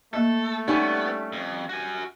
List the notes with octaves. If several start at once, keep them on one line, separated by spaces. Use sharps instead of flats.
A3 A#3 A4 D#5 E5
G3 B3 C#4 D#4 F#5
F2
F#4 G#5